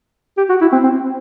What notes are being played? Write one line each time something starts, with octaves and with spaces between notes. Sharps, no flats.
G4
F#4
E4
C4
C4